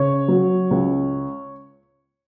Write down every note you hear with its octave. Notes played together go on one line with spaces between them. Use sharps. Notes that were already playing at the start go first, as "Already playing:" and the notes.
Already playing: C#3 C#5
F#3
C#2